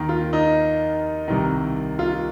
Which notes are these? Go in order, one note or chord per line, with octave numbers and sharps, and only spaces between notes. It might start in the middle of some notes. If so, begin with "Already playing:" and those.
Already playing: D#2 D#3
F4
D#4
C2 C3 D#3
F4